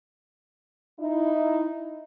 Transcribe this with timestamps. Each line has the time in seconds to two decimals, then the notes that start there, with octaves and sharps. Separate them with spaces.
0.99 D#4 E4